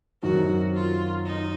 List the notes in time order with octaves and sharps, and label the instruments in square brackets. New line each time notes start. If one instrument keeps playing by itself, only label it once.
[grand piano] F#2 D#3 F#3 C4 [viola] F#4
[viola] F4
D#4